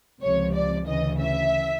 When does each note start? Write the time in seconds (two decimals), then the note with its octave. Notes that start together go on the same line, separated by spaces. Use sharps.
0.23 C#2 C3 F3 C#5
0.55 D5
0.87 D2 C#3 E3 D#5
1.19 E5